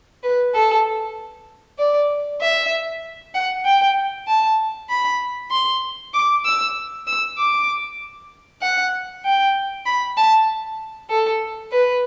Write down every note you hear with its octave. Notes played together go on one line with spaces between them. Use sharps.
B4
A4
D5
E5
F#5
G5
A5
B5
C6
D6
E6
E6
D6
F#5
G5
B5
A5
A4
B4